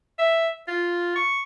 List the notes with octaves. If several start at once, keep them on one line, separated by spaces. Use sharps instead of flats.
E5
F4
C#6